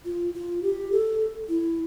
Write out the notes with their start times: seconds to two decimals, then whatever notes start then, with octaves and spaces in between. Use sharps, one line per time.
0.05 F4
0.34 F4
0.63 G4
0.92 A4
1.49 E4